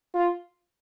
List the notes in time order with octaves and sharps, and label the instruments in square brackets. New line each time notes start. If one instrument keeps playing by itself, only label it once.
[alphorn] F4